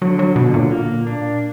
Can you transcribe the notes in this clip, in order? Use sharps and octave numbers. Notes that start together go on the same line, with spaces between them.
D3 F#3
F#3
B2 D3
A#2
A#3
D4